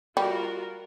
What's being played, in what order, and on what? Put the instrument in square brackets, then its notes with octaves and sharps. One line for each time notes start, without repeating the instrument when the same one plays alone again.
[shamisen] G3 [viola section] F4 F#4 A#4